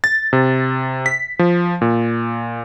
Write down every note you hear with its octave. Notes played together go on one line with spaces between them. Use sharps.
A6
C3
B6
F3
A#2